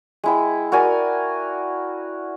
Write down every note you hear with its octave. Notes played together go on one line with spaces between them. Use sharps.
G#3 E4 G5
F#4 A#4 D5 G#5